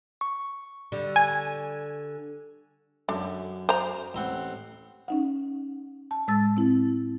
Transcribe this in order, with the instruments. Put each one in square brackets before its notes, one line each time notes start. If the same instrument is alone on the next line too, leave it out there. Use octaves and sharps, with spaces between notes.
[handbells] C#6
[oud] D3 G3
[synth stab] G#5
[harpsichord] F#2 [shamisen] D3
[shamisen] C5 A#5
[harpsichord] A1 C4 F#5
[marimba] C#4 D#4 F#5
A5
A2 G#3 A5 E6 A6
C4 E4